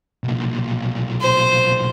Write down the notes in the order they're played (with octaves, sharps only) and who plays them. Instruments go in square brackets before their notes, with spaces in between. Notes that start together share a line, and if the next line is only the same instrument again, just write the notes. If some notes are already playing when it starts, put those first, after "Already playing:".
[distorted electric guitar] B1 A#2
[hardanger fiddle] C5